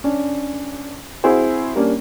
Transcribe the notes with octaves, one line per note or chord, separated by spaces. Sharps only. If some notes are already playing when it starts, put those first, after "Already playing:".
C#4 D4
C4 E4 F#4 G#4 C5
G3 A#3 C#4 D4